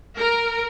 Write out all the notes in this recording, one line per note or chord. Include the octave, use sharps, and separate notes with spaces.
A#4